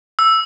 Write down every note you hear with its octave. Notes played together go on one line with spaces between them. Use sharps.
E6